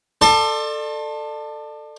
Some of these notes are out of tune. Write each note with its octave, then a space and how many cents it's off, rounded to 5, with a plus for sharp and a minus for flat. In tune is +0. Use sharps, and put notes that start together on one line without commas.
A4 +10 D5 +35 C6 +40